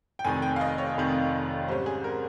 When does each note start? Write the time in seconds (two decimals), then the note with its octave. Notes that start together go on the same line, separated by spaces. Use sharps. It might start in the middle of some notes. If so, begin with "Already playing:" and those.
0.19 G5
0.25 F1 F2 D#3 G#5
0.42 G5
0.56 F5
0.61 D#5
0.78 C#5
0.97 F1 F2 D#3
1.68 G#2 G3 C#4 C5
1.86 G#4
2.04 A#4